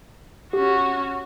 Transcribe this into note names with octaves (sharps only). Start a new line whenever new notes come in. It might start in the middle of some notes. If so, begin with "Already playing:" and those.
C#4 F#4 G4